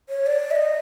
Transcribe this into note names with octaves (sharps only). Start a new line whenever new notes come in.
C#5
D5
E5
D#5